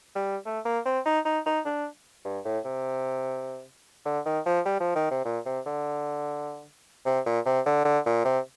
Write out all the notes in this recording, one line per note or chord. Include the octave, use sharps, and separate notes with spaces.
G3
A3
A#3
C4
D#4
D#4
D#4
D4
G2
A2
C3
D3
D#3
F3
G3
F3
D#3
C3
A#2
C3
D3
C3
A#2
C3
D3
D3
A#2
C3